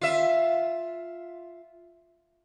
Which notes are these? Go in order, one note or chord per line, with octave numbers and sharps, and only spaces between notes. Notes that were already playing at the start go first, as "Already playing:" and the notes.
F4 E5